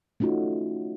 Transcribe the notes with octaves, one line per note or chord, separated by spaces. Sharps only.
A3 C#4 D#4 F4 F#4